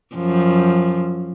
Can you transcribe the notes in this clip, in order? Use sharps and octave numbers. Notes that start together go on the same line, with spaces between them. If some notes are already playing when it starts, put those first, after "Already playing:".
F#2 F3